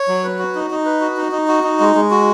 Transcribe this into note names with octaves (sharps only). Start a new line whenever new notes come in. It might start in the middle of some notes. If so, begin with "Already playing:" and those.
Already playing: C#5
F#3
B4
F#4
D#4
D#4
B4
F#4
D#4
D#4
F#4
D#4
G#3
G#3
F#4